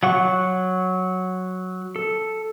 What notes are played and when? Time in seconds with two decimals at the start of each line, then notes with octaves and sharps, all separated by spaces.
0.03 F#3 F#5 C#6
1.96 A4